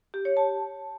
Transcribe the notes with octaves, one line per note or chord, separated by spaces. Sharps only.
G4
C#5
A5